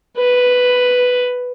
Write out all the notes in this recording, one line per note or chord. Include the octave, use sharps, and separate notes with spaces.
B4